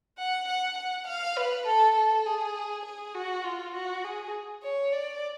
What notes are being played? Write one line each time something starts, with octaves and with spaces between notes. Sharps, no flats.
F#5
F#5
F#5
F5
B4
A4
A4
G#4
G#4
F#4
F4
F#4
G#4
C#5
D5